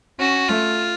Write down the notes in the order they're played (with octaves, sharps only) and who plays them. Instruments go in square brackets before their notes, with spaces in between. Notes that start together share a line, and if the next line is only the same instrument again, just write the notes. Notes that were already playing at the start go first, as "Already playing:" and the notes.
[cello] C#4 [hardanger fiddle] F#4
[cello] A3 [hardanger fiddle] F4